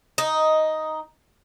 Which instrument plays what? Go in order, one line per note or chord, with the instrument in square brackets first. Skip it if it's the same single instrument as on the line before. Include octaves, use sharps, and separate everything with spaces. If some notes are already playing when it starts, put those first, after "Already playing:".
[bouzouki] D#4